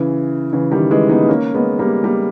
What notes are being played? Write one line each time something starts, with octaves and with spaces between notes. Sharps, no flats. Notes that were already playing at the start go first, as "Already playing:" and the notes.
Already playing: C#3 E3
C#3 E3
D#3 G3
E3 G#3
B3 D#4
B3
A#3 C#4
G#3 B3
G3 A#3
G3 A#3